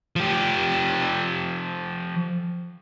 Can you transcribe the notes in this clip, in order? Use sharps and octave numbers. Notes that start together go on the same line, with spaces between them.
F3 G4